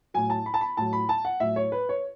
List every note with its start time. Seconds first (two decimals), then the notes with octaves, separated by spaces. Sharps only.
0.14 A2 F#3 G#5
0.30 A5
0.46 B5
0.54 A5
0.61 B5
0.77 A2 F#3 A5
0.93 B5
1.09 A5
1.25 F#5
1.40 A2 F#3 E5
1.56 C#5
1.72 B4
1.89 C#5